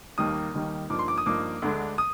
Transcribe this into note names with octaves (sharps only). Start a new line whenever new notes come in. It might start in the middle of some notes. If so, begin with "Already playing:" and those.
D#2 D#3 G3 A#3 D#4 D#6
D#2 D#3 G3 A#3 D#4
G2 F3 A#3 D#4 D6
C6
D6
D#6
G2 F3 A#3 D#4 D6
D2 D3 G#3 D4
D#6